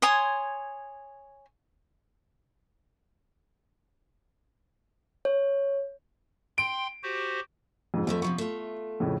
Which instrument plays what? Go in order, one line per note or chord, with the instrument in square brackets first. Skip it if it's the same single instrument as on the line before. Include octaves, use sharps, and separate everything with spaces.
[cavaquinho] C#5 G#5 C6 D#6
[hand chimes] C#5
[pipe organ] G5 C6 [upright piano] D7
[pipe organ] F#4 G4 C5
[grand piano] F2 G#2
[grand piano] F2 [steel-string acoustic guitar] E3 F3 A3
[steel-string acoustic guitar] C3 F3 B3 [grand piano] C#6
[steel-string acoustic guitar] A3 F4
[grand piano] F2 A2 C#3